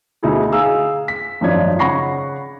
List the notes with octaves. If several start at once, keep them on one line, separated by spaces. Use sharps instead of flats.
D2 B2 D#4 E4 G#4
G#4 F5 A#5 E6
B6
G#1 F#2 F3 D4 D#4 G#6
C#3 F#5 B5 C#6 A#6 C7